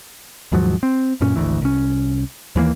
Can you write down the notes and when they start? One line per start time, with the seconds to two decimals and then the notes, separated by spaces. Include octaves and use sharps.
0.52 D#2 G#2 F3 F#3
0.83 C4
1.21 F#2 A#2 C#4
1.36 G#1 D2 E3
1.62 C2 C#4
2.56 D#2 E3 F#3 A#3